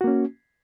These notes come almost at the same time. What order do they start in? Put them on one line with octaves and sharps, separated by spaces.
F#4 A#3 C#4